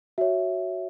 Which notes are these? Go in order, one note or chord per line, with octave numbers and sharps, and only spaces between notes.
F#4 C#5 E5